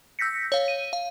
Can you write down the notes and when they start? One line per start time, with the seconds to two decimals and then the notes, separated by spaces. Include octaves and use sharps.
0.19 E6 G6 A#6 B6 C#7
0.52 C#5 F5
0.68 D#7
0.93 F5